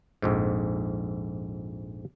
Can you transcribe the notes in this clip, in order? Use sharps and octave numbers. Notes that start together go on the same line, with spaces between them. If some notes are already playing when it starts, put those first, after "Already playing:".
A#1 F2 G#2